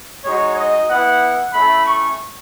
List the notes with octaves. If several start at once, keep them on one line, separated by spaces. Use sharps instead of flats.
G#3 D#4 F#4 C#5
D#5
B3 E4 F#5
A3 C#4 E4 B5
C#6